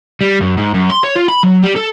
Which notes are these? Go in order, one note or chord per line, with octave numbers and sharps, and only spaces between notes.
G3
F#2
G#2
F#2
C6
C#5
F4
B5
F#3
G3
A4